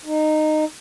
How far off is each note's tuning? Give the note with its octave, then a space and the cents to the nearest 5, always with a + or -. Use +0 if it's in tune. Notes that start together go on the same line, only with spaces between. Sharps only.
D#4 -15